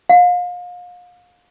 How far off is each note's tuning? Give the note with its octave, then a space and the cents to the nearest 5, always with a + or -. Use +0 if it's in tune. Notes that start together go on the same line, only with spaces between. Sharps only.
F5 +35